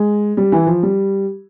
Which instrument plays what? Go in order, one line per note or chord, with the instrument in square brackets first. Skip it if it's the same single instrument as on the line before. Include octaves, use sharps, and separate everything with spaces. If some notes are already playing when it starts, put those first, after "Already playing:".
Already playing: [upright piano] G#3
G3
E3
F3
G3